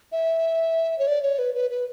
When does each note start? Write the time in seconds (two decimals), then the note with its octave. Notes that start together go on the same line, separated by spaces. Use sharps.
0.12 E5
0.99 C#5
1.07 D5
1.23 C#5
1.39 B4
1.55 B4
1.70 B4